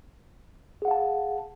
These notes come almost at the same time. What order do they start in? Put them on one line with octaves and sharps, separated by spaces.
G#4 F#5 F5 A5